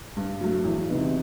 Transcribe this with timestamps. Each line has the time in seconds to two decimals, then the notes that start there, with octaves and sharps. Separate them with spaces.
0.16 G2
0.41 F#3 A3
0.64 E2
0.88 C3 E3 B3 D#4